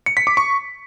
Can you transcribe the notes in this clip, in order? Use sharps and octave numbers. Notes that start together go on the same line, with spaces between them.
C#7
B6
D6
C#6